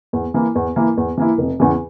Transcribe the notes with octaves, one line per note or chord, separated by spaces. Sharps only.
E2
E3 A#3 E4
E2
E3 A#3 E4
E2
E3 A#3 E4
F1
E2 C#3 E3